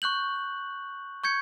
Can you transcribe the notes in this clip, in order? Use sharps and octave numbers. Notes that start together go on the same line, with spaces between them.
C#6 F#6 G6 F#7
C#6 G6 G#6 C#7